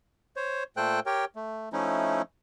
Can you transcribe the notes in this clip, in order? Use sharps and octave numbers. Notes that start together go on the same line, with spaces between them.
C5 C#5
A#2 A3 A4 C5 G5 F#6
G4 A#4 C#5 G5
A3
F3 A3 C#4 D#4 E4